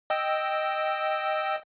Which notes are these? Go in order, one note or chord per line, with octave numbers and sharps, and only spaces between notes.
D#5 G5 E6